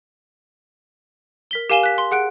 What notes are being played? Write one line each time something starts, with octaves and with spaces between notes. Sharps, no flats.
A#4 B6 G7
G4 A#4 F5 G#5 E7 G7
F#6 B6
C6
G#4 F#5 F#6 D7